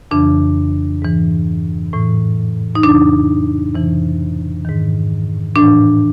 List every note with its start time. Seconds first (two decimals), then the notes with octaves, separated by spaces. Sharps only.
0.11 F2 C#3 E3 D4
1.02 G#2 E3
1.93 A2 E3
2.75 D#4
2.83 F2 C#3 E3 D4
3.74 F2 C3 E3
4.65 G#2 D#3
5.56 A2 E3 D4